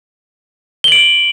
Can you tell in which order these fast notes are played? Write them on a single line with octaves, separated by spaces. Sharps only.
G7 F#7 D7